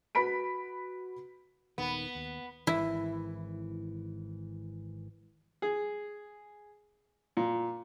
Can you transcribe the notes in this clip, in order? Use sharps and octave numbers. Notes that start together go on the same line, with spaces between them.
F#4 B4 B5 B6 D7
D#1 D#3 B3
D#2
G#1 E3 E4
G#4
A#2